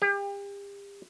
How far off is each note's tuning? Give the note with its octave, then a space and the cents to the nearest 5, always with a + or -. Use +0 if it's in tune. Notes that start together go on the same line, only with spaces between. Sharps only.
G4 +35